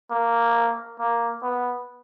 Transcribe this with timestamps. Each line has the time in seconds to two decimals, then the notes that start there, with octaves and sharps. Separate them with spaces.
0.11 A#3
0.99 A#3
1.42 B3